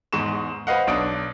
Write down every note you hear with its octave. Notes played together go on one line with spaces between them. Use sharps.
E2 G#2 G#3 C#6 E7
B4 C5 D#5 F5 F#5
B1 D4 D#6 D7